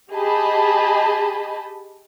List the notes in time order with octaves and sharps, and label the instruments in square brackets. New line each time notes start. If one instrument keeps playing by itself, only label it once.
[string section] G4 G#4 D#5 A5 B5